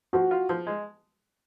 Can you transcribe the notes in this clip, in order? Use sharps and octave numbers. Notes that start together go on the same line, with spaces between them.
F3 F#4
F4
F3
G#3